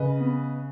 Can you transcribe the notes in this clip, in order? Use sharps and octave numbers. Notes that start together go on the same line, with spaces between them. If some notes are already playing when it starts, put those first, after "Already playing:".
Already playing: C#3 B4 D#5
B3